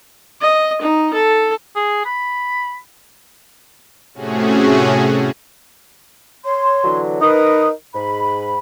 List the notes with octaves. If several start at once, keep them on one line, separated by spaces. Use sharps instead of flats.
D#5
D#4
A4
G#4
B5
A2 C3 A3 C#4 F#4 G#4
C#5 C6
D3 E3 F#3
D#4 A#4 B4 D#6
G#2 B5